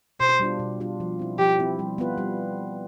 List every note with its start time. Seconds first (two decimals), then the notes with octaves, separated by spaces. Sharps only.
0.20 B2 C5
0.40 G3 D4 F4
0.59 B2
0.80 G3 D4 F4
1.00 F3
1.19 C4 E4
1.39 F3 G4
1.59 C4 E4
1.79 G3
1.98 B3 F4 B4
2.18 G3